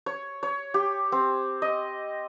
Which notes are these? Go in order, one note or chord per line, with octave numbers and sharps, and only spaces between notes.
C#5
C#5
G4
C4
D#5